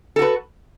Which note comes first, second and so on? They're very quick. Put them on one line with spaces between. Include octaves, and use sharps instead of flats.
A4 F#4 B4